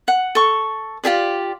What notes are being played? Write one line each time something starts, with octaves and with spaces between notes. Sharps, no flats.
F#5
A4 C#6
F4 G4 G#4 D5